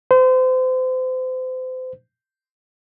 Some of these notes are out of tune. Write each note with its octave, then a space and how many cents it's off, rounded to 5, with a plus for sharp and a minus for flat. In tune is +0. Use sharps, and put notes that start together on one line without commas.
C5 -35